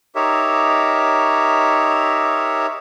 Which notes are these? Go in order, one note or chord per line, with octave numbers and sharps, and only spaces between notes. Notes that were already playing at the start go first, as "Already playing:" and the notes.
D#4 G4 A#4 C#5 E5